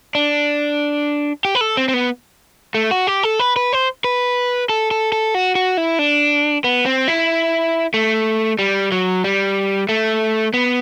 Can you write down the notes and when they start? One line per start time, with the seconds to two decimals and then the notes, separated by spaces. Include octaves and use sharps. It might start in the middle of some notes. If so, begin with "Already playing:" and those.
0.15 D4
1.45 G4
1.55 B4
1.61 A4
1.77 C4
1.88 C4
1.94 B3
2.74 A3
2.91 F#4
3.07 G4
3.23 A4
3.39 B4
3.56 B4
3.73 C5
4.04 B4
4.69 A4
4.91 A4
5.12 A4
5.35 F#4
5.55 F#4
5.77 E4
5.99 D4
6.64 B3
6.86 C4
7.08 E4
7.94 A3
8.59 G3
8.92 F#3
9.24 G3
9.89 A3
10.54 B3